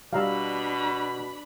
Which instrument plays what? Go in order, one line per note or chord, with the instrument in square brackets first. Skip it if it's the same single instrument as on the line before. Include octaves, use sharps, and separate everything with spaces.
[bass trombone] B2 [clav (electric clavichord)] G3 [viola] D4 B5 [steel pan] F5 A#5 E6